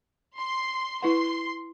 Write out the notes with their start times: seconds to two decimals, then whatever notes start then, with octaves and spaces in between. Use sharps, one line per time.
0.38 C6
1.02 E4 B4 F#5 C6